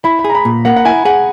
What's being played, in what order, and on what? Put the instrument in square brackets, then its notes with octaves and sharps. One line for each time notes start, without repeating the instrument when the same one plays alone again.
[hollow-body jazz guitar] E4 [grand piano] B5
[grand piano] B5
[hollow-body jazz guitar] G#4
[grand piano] A#5
B5
[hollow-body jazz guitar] A#2
[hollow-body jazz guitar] A#3 [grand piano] F#5
[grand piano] F#5
[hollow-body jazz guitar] E4 [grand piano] G#5
[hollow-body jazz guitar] G#4 [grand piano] F#5